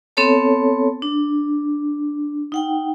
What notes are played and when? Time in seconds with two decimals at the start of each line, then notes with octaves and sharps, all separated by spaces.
0.17 B3 C4 A4 C#5 A5
1.02 D4
2.52 D#4 F#5 G5